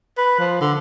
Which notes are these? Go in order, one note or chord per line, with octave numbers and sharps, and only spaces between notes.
B4
F3
D3